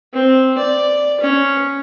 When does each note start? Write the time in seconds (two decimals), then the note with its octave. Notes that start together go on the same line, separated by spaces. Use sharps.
0.13 C4
0.58 D5
1.20 C#4